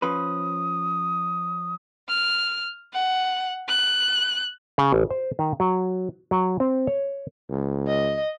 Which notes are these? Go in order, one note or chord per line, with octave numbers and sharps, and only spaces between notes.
F3 C#4 B4 D#6
F6
F#5
F#6
C#3
A1
C5
D#3
F#3
F#3
C4
C#5
C#2
D#5